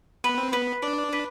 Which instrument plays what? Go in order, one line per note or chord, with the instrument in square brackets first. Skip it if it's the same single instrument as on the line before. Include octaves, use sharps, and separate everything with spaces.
[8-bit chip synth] B3 [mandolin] B4
[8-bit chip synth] C4
[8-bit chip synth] B3 [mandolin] B4
[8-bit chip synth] D4 [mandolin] D5
[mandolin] B4